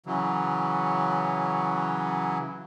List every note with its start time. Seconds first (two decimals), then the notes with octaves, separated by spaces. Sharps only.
0.06 C#3 E3 F#3